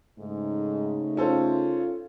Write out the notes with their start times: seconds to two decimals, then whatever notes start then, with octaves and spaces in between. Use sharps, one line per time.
0.19 G#2 C#3 A3 D#4
1.17 C#4 F4 A4 C5